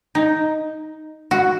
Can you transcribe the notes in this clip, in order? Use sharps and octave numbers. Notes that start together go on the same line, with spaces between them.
D#4
F#4